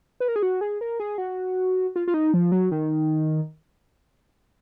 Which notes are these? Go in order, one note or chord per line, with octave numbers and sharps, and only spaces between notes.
B4
A#4
G#4
F#4
G#4
A#4
G#4
F#4
F4
F4
D#4
F3
F#3
D#3